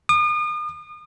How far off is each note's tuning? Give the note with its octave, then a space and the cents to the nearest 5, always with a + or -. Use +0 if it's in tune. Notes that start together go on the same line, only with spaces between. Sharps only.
D#6 -40